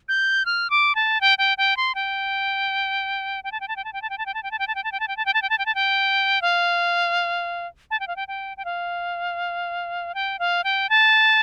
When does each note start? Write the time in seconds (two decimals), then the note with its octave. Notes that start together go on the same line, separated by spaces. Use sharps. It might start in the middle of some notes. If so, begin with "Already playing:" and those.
0.09 G6
0.46 F6
0.70 D6
0.95 A5
1.21 G5
1.38 G5
1.58 G5
1.77 C6
1.95 G5
3.44 G5
3.52 A5
3.61 G5
3.68 A5
3.76 G5
3.85 A5
3.93 G5
4.02 A5
4.10 G5
4.18 A5
4.26 G5
4.34 A5
4.43 G5
4.51 A5
4.59 G5
4.68 A5
4.75 G5
4.84 A5
4.92 G5
5.00 A5
5.08 G5
5.17 A5
5.26 G5
5.34 A5
5.42 G5
5.50 A5
5.58 G5
5.66 A5
5.75 G5
6.42 F5
7.91 A5
8.00 G5
8.08 F5
8.16 G5
8.28 G5
8.57 G5
8.65 F5
10.15 G5
10.39 F5
10.64 G5
10.89 A5